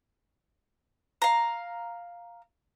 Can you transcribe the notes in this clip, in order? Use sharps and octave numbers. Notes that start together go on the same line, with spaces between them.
F5 A#5